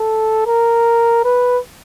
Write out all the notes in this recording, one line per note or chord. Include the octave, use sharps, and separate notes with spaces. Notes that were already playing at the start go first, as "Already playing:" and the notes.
Already playing: A4
A#4
B4